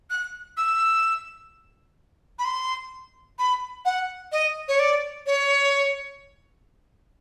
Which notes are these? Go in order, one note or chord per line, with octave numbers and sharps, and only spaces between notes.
F#6
E6
B5
C6
B5
F#5
D#5
C#5
D5
C#5